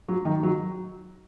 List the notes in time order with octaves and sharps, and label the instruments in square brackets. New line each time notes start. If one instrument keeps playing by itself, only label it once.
[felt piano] F#3
D#3
F#3